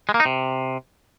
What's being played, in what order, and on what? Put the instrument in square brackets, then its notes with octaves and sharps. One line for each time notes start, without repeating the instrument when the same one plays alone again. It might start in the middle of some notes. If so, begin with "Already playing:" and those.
[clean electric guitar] G#3
A#3
D#4
C3